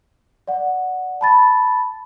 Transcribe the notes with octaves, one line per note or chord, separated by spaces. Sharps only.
D5 F#5
A5 B5 A6